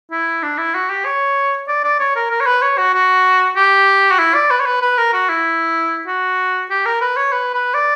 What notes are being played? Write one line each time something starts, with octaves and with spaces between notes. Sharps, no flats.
E4
D4
E4
F#4
G4
C#5
D5
D5
C#5
A#4
A#4
C#5
B4
C#5
F#4
F#4
G4
F#4
E4
D5
B4
C#5
B4
B4
A#4
F#4
E4
F#4
G4
A#4
B4
C#5
B4
B4
D5